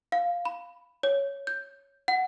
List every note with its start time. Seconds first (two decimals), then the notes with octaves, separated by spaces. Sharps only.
0.12 F5
0.45 B5
1.03 C#5
1.47 G6
2.08 F#5